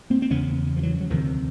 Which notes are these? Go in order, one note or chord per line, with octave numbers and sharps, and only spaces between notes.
A#3 C4
C4
E2 C#3 B3 C#4
F3
E3 F#3
F#3
D2 C3 D#3 F3